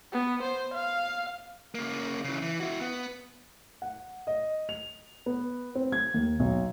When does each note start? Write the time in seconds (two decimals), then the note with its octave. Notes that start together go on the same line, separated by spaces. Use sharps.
0.12 B3
0.43 C5
0.75 F5
1.75 C#3 A#3
2.24 C#3 E3
2.42 E3
2.60 E4 F#4
2.81 B3
3.82 F#5
4.27 D#5
4.69 F7
5.26 B3
5.75 C4
5.92 G#6
6.14 D#2
6.40 B1